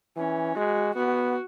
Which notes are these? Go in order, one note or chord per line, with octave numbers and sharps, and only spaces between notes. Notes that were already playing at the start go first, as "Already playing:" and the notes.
E3 C#4
G#3 F#4
B3 F#4